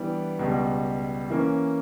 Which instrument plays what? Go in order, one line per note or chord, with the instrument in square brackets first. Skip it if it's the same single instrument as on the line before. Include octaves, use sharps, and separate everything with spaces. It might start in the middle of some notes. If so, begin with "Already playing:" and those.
Already playing: [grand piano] E3 G3 B3 D4
C#2 B2 G3
E3 A#3 C#4